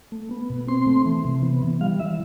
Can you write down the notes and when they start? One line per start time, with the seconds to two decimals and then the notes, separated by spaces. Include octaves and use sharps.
0.12 A3
0.31 B3
0.50 B2
0.68 C4 C6
0.87 A3
1.06 E3
1.25 C3
1.43 B3
1.62 E3
1.81 G3 F5
1.99 E3 E5